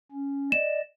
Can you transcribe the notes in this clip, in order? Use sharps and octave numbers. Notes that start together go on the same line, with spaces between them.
C#4
D5 D#5 E7